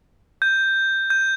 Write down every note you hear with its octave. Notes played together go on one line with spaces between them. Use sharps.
G6
G6